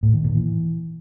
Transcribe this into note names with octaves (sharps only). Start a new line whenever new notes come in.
A2
D#3
A#2
E3